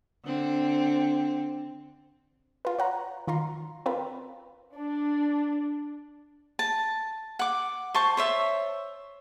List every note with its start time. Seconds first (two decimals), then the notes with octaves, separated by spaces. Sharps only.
0.25 D3 C4
2.65 F4 B4
2.78 C#5 F#5 A#5
3.27 D#3 F4 A#5 C6
3.86 C4 F4 A#4 B4
4.76 D4
6.59 A5
7.39 F#5 D6
7.94 C5 A5 C#6
8.17 C5 C#5 E5